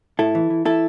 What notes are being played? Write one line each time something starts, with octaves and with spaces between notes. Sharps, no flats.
A2 E4 A4
E3
E3
E3 E4 A4